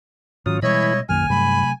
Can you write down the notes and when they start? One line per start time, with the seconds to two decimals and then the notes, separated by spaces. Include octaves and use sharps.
0.46 G#2 D#3 F#3 C#4 F4 D#6
0.62 B2 E3 G3 G#3 E4 C#5 D#5 B5
1.09 B1 F#2 D#3 A#3 G#5 F6
1.30 G2 C3 F#3 A3 B5